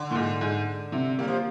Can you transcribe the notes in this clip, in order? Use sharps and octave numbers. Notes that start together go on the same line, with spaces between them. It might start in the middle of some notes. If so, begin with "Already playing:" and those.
Already playing: D3
A#2
G#2
G#2
C3
G3 A#3
F3